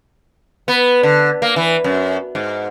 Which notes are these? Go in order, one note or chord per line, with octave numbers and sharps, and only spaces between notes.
B3
D3
A#3
E3
F#2
G#2